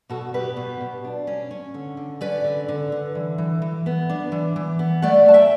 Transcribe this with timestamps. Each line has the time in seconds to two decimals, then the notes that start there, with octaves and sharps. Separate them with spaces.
0.10 B2 F#4 A4
0.34 B2 G4 B4
0.56 B2
0.81 B2
1.04 D4
1.27 C#4
1.51 C#4
1.74 D3
1.97 D3
2.21 C#4 B4 D5
2.44 D3
2.69 D3
2.92 D3
3.15 E3
3.38 E3
3.62 E3
3.86 B3
4.10 D4
4.32 E3
4.56 E3
4.79 B3
5.02 A3 D5 F#5
5.26 A3 A5
5.34 E5 G5